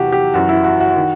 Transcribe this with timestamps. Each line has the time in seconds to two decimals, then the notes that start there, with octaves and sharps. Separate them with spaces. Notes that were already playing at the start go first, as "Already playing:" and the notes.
Already playing: E2 C3 E3 F#4 G4
0.12 G4
0.34 F#2 E3 F#4
0.49 E4
0.64 F#4
0.80 F#4
0.96 D#3